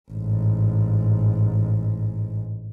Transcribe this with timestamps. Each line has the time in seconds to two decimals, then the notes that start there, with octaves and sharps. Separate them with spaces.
0.11 A1 G#2